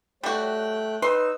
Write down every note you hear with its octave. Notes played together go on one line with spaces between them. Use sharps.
G3 A3 F#4 C#5 G5 F#6
D#4 B4 C6 E6